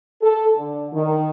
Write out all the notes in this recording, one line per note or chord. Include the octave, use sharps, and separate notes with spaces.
A4
D3
D#3